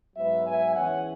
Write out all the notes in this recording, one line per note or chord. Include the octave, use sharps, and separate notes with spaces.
G#2 F#3 B3 B4 E5
E5 G#5
E2 E3 C#4 C#5 F#5